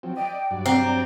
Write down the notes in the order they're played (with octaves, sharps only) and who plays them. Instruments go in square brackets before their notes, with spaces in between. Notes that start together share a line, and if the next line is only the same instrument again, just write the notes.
[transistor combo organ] F3 F#3 C4
[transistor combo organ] D5 D#5 [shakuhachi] G5
[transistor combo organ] G2 F#3 D5
[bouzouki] C4 [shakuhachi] A#5